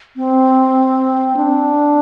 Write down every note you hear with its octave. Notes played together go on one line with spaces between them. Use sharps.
C4
D4